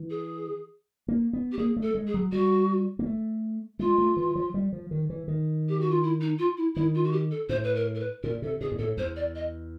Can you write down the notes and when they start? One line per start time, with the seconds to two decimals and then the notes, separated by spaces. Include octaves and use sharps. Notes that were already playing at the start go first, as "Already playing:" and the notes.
Already playing: E3
0.10 G#4
1.08 A#3
1.33 B3
1.52 G4
1.58 A#3 G#4
1.76 A3
1.82 A4
1.95 G#3
2.07 G#4
2.14 F#3
2.32 G3 F#4
2.99 A#3
3.06 A3
3.79 G#3 F4
3.98 A3
4.17 E3
4.35 F3
4.54 G3
4.73 F3
4.91 D#3
5.10 E3
5.28 D#3
5.69 G4
5.80 F#4
5.90 F4
6.02 E4
6.21 D#4
6.39 F4
6.57 E4
6.75 D#3 E4
6.95 F4
7.04 F#4
7.12 G4
7.31 A4
7.49 A2 C5
7.64 B4
7.75 A#4
7.95 A#4
8.00 B4
8.23 A#2 A#4
8.42 C3 A4
8.61 B2 G#4
8.72 G#2
8.79 A2 A4
8.97 E2 C5
9.16 D5
9.35 D#5